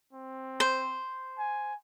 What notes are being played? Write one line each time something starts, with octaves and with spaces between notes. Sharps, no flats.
C4
C5
G#5